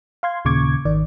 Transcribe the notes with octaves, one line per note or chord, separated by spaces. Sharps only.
F5 C6 G#6
D#2 A#2 C#3 C#6 D6 G#6
G#1 D#3 D5